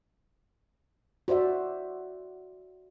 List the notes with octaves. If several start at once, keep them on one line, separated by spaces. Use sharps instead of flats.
F#4 C5 D5 E5